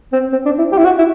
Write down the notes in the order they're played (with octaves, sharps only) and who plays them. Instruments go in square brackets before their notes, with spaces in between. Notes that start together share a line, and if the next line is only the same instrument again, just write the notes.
[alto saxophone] C4
C4
D4
E4
G4
E4
F#4
E4